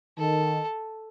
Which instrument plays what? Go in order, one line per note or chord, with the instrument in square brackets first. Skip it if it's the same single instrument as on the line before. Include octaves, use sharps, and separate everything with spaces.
[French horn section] D#3 [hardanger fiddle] A4